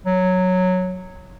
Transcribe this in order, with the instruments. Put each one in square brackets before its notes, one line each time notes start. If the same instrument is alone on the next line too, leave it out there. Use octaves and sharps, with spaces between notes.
[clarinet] F#3